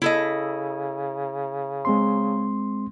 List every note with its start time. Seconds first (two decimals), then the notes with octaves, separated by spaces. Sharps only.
0.02 C#3 E4 A4 D#5
1.85 G#3 C4 C6